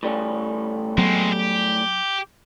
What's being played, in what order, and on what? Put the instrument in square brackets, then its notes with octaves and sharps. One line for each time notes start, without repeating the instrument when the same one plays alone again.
[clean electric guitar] A2 G3 C#4
[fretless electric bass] F#3 B3 [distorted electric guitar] G#3 C4
[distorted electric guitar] G4